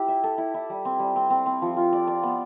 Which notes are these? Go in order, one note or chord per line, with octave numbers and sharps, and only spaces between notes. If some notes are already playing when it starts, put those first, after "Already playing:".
Already playing: E4 G4
E5
A4
E4
E4
G3
C4
G3
C4
C4
C4
F3
F4
D5
D5
B3